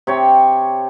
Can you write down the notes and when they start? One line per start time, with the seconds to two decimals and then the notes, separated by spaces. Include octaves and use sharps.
0.07 C3 C#5 G5